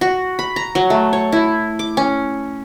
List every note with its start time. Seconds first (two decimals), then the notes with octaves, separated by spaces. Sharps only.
0.01 F#4
0.39 B5
0.56 A#5
0.75 F#3
0.90 A3
1.13 C#5
1.33 E4
1.79 D6
1.97 C#4